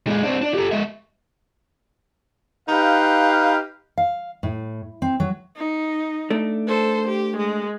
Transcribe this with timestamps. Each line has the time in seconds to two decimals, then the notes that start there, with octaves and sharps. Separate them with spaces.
0.07 A#2 G#3
0.23 C4 D4
0.42 D4
0.54 G4 A4
0.72 G#3 E5
2.68 D#4 G4 B4 F5
3.98 F5
4.43 A2
5.02 C4
5.20 F#3
5.56 D#4
6.30 A3 D4
6.68 A4 C5
7.08 G4
7.36 G#3